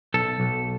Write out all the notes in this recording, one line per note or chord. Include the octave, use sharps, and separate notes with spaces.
B1 A4
B1